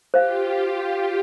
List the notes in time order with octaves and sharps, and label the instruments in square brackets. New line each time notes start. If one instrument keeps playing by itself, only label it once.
[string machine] F4 G4 [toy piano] C5 F5